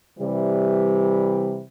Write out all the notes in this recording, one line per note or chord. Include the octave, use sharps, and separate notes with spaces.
C3 E3 G3